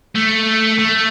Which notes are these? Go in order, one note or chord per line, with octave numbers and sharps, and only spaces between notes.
A3
A3